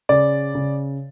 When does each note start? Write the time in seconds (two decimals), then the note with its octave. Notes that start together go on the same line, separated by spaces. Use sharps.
0.09 C#3 D5
0.55 C#3